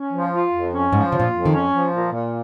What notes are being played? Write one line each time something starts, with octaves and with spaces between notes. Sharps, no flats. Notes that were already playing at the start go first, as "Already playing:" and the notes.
Already playing: C#4
F3
F4
F2
C#4
G#2 F3
C#3 F4
A#2
F2
D#3
C#4
F3
A#2
A#2